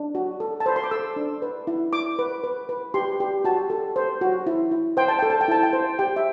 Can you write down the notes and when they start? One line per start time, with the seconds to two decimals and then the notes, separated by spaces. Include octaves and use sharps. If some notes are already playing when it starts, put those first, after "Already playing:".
Already playing: D4
0.15 F#4
0.40 A4
0.60 A5
0.66 C5 B5
0.76 C6
0.84 D6
0.91 A4 E6
1.16 D4
1.42 B4
1.67 E4
1.93 E4 D6
2.19 B4
2.44 B4
2.69 B4
2.94 G4 C6
3.20 G4
3.44 F#4 A5
3.70 A4
3.96 C5
4.21 F#4
4.46 E4
4.71 E4
4.97 C5 G5
5.08 A5
5.19 A4 G5
5.30 A5
5.41 G5
5.48 E4 A5
5.63 G5
5.73 C5
5.99 G4 G5
6.16 E5